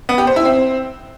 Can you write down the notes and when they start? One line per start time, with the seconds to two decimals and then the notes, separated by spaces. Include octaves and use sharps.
0.09 B3
0.18 G4
0.27 C5
0.36 E4
0.45 C4